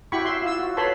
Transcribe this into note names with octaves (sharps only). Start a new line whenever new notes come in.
E4 F#4 G4 B5 C#6
E5 C6
F4 E6
F#4
A4 B4 C#5 A5 B5 C6